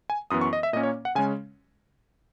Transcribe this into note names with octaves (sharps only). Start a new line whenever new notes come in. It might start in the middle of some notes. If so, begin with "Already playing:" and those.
G#5
F#2 E3 B3 D#6
C#6
D#5
E5
A#2 A#3 C#4 D#5
C#5
F#5
C#3 G#3 C#4 G#5